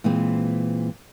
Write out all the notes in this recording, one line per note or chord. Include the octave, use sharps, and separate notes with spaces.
A#2 E3 G#3 C4